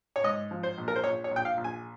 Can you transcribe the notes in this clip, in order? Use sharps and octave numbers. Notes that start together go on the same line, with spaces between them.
C#5
G#2 D#5
F3
C5
A#1
A#4
C5
A#1 C#5
C#5
A#1
G5
F5
A#1
G#5